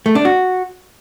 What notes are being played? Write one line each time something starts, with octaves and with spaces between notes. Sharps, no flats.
A3
D4
F#4